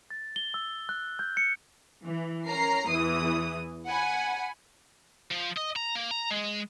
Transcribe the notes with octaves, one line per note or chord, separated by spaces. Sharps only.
A6
G7
E6
F#6
G6
C#7
E3
C#4 A#4 A#5 C7
E2 E3 D#6
F#5 G#5 B5
F3
D#5
A#5
A#3
A#5
G#3